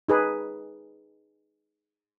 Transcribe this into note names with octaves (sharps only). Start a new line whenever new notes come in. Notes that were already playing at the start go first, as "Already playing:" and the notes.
D#4 G#4 B4